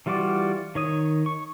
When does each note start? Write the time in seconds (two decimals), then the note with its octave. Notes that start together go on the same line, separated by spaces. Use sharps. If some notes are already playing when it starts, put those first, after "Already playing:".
0.06 E3 G3 F4 F#4 D5
0.75 D#3 C#5 D#6
1.26 C#6